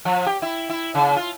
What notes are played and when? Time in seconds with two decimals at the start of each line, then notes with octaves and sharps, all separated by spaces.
0.05 F3
0.26 G4
0.42 E4
0.70 E4
0.95 C#3
1.16 F4